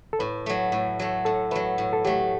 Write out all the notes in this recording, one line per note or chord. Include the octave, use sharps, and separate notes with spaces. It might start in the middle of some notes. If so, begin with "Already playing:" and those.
A4
A2 B4
F#3 A3
A2
F#3 A3
A2 A4
F#3 A3 B4
A2
A4
F#3 A3 G4